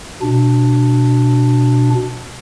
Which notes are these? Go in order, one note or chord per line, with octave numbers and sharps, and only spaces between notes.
B2 D4